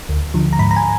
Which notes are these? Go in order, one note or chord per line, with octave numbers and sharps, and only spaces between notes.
D2
D3 F3
A#5
G#2 B5
A#5
G#5